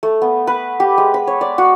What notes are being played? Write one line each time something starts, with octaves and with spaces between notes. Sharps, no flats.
A3
B3
B4
G4
G#3
B5
C#5
D5
F#4